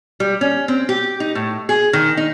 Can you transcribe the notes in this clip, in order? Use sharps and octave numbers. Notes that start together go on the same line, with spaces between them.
G3
C#4
C4
G4
D#4
A2
G#4
D#3
D#4